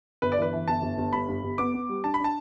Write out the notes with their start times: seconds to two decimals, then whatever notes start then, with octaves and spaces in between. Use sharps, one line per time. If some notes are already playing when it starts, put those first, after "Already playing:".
0.22 G1 B4
0.32 D5
0.38 E3 B4
0.53 E3
0.68 G1 A5
0.82 G1
0.98 G1
1.13 G2 B5
1.28 G2
1.43 G1
1.58 B3 D6
1.74 B3
1.89 G3
2.04 D4 A5
2.14 B5
2.20 D4 A5